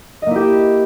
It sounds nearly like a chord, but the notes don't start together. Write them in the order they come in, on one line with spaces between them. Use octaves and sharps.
D#5 A#3 E4 G4